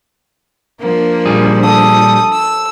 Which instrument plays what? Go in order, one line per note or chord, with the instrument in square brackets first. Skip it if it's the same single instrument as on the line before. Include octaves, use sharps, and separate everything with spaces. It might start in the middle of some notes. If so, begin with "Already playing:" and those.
[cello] F3 D4 [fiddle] A#3
[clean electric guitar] A#2 G3 G#4
[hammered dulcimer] A4 [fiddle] D#6
[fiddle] E6